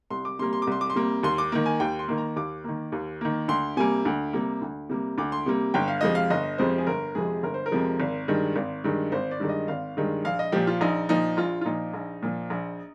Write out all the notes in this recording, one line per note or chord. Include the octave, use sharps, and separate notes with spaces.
C2 C6
D6
C3 G3 A#3 C6
C6
D6
C2 C6
D6
C6
C3 G3 A#3
D#2 C6
D6
D#3 A#3
G#5
D#2 G5
C6
D#3 A#3
A#5
D#2 D6
D#3 A#3
D#2
D#3 A#3
D2 C6
C3 G3 A#3 G#5
D2
C3 G3 A#3
D2
C3 G3 A#3
D2 D6
C6
C3 G3 A#3
G1 G5
F5
F2 C3 F3 G#3 D#5
F5
G1 D#5
F2 C3 F3 G#3 C5
G#4
G1 A#4
F2 C3 F3 G#3 G#4
G1 A#4
C5
A#4
F2 C3 F3 G#3
G#1
G2 D#3 G#3
G#1
G2 D#3 G#3
G#1 C5
D5
G2 D#3 G#3
D#5
G#1 F5
G2 D#3 G#3
A#1 F5
D#5
A#2 F3 G4
F4
A#1 D#4
A#2 F3 D#4
A#1 F4
F4
A#2 F3 D#4
A#1
A#2 F3
A#1